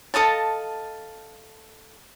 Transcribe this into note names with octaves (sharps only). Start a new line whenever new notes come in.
A4 D#5 F5 A5